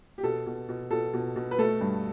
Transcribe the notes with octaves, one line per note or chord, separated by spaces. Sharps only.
G4
B2 A4
B2
B2
B2 A4
B2
B2
B4
A3 A4
G2